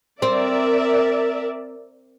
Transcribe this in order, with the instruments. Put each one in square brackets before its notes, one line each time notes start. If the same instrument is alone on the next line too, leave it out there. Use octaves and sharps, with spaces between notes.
[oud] C4 [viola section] A#4 D5 E5